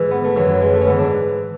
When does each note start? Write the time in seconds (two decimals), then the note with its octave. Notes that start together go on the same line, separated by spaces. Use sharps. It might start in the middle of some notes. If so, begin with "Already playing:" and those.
Already playing: G#2 E3
0.11 B3
0.24 A3
0.36 F#2 E3 F#3
0.49 F#3
0.61 G#3
0.74 A3
0.81 C#4
0.86 G#2 E3 B3
0.99 D4